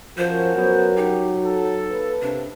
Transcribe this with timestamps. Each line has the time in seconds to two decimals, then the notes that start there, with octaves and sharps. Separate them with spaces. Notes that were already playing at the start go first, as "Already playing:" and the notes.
0.18 F3 C#4 F#4 A#4 C5
0.57 F#3 B3
0.96 D#4 G4
1.45 A4
1.90 A#3 B4
2.22 C3 D4